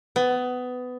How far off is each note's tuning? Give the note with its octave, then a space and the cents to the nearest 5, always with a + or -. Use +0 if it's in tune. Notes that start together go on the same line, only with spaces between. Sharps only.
B3 +20